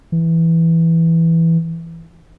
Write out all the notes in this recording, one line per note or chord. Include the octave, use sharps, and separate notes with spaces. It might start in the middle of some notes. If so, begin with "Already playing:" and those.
E3